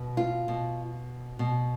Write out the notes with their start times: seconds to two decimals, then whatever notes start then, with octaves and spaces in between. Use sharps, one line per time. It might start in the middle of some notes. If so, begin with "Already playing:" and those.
Already playing: B2
0.17 F4
0.48 B2
1.39 B2